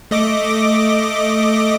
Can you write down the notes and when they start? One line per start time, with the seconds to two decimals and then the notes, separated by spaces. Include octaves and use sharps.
0.11 A3 D#5 D6